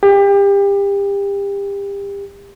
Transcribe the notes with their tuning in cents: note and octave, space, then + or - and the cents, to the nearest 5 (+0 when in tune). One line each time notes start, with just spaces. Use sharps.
G4 +30